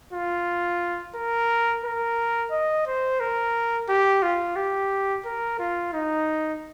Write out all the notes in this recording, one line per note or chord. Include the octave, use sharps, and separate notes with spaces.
F4
A#4
A#4
D#5
C5
A#4
G4
F4
G4
A#4
F4
D#4